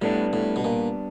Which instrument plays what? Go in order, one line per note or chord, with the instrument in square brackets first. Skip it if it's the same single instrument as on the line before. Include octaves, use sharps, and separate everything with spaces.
[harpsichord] A2 [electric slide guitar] G3 B3 D4
[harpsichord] A2
B2
A#2